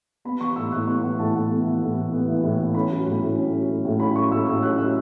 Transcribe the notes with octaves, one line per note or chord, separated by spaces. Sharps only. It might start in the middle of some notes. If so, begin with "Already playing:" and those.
B3 B5
E3 C#6
A2 E6
A2 F#6
B3 C#6
E3 F#5
A2 A5
A2 F#5
B3
E3
A2
A2
B3
E3
A2
A2
C#4 B5
F#3
A2
A2
C#4
F#3
A2
A2
C#4 B5
F#3 C#6
A2 E6
A2 E6
C#4 F#6
F#3 E6